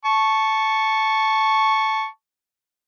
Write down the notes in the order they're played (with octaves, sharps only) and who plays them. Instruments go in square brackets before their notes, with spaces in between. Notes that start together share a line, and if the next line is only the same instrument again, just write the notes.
[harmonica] A5 C#6